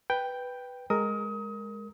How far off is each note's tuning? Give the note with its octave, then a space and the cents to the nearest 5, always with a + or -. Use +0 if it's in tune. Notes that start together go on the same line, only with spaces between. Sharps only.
B4 +0 G5 +0
G#3 +0 A#4 +0 D#6 +30